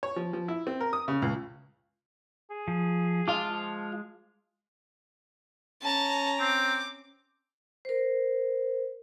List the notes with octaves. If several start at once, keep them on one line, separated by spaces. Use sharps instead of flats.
C#5
F3
F3
E4
C4
A#4
D#6
C#3
C#2
G#4
F3
G#3 F4 F5 A5 D6
F3
C#4 A5 A#5
C4 D6
A#4 C5